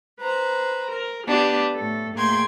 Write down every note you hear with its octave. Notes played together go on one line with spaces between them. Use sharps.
B4 C5 A#5
A#4
B3 D4 G4
A2 A4
A2 A#3 G#4 G5 C6 G#6